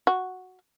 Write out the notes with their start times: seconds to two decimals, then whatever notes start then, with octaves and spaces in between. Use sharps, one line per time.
0.07 F#4